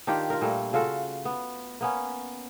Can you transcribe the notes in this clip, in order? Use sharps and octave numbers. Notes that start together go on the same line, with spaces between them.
D#3 D4 F4 G4
F4 A#4
A#2 G3 A3
C#3 F4 F#4 A4
B3
A#3 B3 C#4